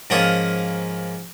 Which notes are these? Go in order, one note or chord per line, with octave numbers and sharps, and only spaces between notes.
G#2 F3 A#3 C#4 F4 D#6